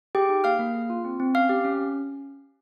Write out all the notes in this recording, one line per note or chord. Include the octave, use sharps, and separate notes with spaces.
G4 G#4 G5
D#4
A#3 F5 F6
A#3
G#4
F4
C4
C4
C#4 F5 F6
G4
C#4